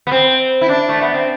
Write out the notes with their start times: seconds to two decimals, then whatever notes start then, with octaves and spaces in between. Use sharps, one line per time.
0.07 B3
0.11 C4
0.61 E4
0.69 D4
0.89 A3
1.02 B3
1.14 C4